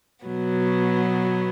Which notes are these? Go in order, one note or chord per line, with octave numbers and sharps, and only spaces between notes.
B2 F#3 B3